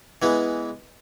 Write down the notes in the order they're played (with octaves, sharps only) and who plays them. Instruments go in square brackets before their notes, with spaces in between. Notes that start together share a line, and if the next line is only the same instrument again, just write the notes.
[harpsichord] E3 G#3 B3